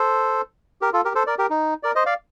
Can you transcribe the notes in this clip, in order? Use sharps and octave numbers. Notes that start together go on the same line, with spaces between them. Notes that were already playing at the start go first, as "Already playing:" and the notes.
Already playing: A4 C5
G4 A#4
F4 A4
G4 A#4
A4 C5
A#4 D5
G4 A#4
D#4
A#4 D5
C5 D#5
D5 F5